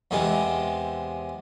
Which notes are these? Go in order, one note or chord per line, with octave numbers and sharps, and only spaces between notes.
E2 C3 E3 G#3